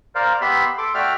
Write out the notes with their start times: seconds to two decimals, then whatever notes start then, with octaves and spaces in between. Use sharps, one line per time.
0.15 A#4 C5 D5 F5
0.41 B3 G4 E5 B5 C6
0.78 A4 C6 D6
0.94 A3 F#4 D5 E5 G5 F6